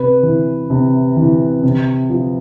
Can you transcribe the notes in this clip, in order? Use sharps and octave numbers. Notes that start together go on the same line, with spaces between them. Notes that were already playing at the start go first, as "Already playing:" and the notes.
Already playing: C3 B4
E3
C3
E3
C3
F3